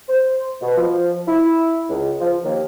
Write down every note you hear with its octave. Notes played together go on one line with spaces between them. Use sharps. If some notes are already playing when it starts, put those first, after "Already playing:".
C5
B2
F3
E4
C#2
F3
D#2